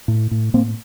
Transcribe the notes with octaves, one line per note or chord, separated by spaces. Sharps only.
A2
A2
A2 A#3 C4